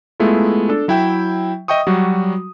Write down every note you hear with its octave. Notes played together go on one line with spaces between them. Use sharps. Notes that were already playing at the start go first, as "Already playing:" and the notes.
G#3 A3 B3 E4 F4
D4 A4
F#3 E4 E5 G5
D#5 E5 G5 C#6 D#6
F#3 G3 F#4